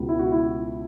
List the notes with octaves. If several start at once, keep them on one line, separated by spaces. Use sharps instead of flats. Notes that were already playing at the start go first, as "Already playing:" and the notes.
Already playing: C#2 B2
E4
F#4
E4